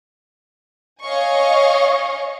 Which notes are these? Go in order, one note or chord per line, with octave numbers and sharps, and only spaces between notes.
C#5 D#5 F5 G#5 C#6